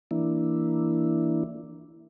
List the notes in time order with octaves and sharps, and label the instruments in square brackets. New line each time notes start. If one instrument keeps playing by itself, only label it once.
[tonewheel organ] E3 A#3 D4 E4